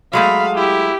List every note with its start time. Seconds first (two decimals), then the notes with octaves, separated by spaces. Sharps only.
0.13 F#3 G#3 A3 F5 B5
0.56 E4 G4